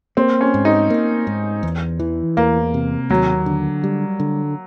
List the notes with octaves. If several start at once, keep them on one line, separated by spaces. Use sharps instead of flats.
A#3 C4
C#4
G#2
D#4
A#3
G#2
E2
E3
E2 A#3
C3
D#2 F#3
D3
G3
D3